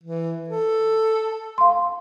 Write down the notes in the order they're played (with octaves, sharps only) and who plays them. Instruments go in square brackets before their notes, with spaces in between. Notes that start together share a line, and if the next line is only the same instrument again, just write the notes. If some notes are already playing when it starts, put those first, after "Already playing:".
[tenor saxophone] E3
A4
[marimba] F5 C6